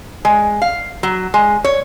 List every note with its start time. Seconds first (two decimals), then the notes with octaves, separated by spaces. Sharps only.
0.25 G#3
0.62 F5
1.03 F#3
1.34 G#3
1.64 C#5